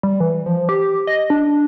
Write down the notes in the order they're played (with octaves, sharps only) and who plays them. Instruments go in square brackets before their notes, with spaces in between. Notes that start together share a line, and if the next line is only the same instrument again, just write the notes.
[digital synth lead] G3
E3
F3
G4
D#5
D4